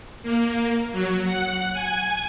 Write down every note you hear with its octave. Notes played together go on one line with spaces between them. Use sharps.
A#3
F#3
F#5
G#5